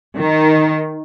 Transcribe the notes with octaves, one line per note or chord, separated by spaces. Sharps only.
D#3